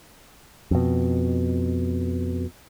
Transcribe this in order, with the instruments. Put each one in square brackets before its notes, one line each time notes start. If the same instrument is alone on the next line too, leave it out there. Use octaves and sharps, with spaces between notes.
[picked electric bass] F2 B2